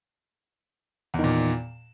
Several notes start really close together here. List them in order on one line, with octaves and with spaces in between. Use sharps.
E2 D#3 A#2